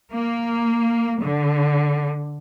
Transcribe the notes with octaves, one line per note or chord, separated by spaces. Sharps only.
A#3
D3